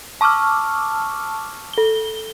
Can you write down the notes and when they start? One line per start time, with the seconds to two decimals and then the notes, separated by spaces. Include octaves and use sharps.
0.21 A5 C#6 D6 E6 F6
1.73 A4 G7